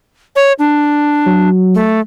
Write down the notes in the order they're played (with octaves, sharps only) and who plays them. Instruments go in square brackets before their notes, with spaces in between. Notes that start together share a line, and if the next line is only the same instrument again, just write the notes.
[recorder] C#5
D4
[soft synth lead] F#3
[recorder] A3